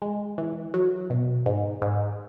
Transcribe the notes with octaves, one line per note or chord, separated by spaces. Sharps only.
G#3
E3
F#3
B2
G#2
G#2